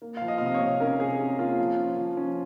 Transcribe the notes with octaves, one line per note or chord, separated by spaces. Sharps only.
A#3
F3 F5
D#5
F5
C3 D#5
C#5
C3
C#4 A#4
C3 G#4
C#4
A#3 F4
F3
C#4
F3
C#4